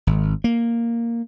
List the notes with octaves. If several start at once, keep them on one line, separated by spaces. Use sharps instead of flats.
G#1
A#3